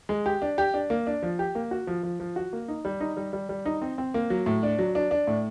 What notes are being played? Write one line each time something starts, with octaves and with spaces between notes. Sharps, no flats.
G#3
G4
D4
G4
D4
A#3
D4
F3
G4
A#3
F#4
F3
F3
F3
F#4
A#3
D#4
G3
D#4
G3
G3
G3
D#4
C4
C4
A#3
F#3
A2
D4
F#3
D4
D4
A2